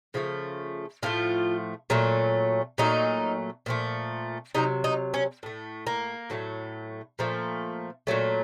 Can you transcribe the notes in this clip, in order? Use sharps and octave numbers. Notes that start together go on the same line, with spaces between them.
C#3 F3 A3
A2 F3 A3 F4
A#2 F#3 A3
A#2 F#3 A3 D#4
A#2 F3 A3
C3 D#3 F#3 D#4
D#4
C#4
A2 A3
A#3
A2 F#3 A3
A#2 F3 A3
A#2 F#3 A3